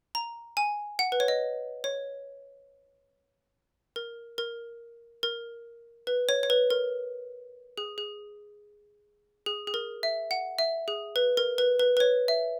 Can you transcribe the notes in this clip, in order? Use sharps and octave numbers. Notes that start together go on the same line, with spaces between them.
A#5
G#5
F#5
B4
C#5
D#5
C#5
A#4
A#4
A#4
B4
C#5
C#5
B4
A#4
G#4
G#4
G#4
G#4
A#4
E5
F#5
E5
G#4
B4
A#4
B4
B4
B4
C#5
E5